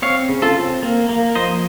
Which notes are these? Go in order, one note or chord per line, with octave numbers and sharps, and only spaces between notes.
C4 C#5 F5
C#3
F4 A4
C4
A#3
A#3
F3 C5 D#5